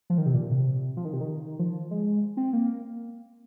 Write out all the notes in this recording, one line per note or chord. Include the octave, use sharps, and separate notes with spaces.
F3
D#3
C3
A#2
C3
F3
D#3
C3
D#3
F3
G#3
C4
A#3